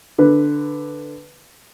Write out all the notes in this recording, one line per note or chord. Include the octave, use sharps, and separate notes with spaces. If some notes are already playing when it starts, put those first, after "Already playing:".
D3 B4